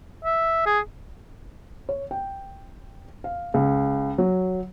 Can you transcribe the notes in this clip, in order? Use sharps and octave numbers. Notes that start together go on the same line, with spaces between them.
E5
G#4
C#5
G5
F5
C#2
F#3